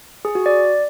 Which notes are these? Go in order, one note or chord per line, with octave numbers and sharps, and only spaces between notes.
G#4
F#4
D5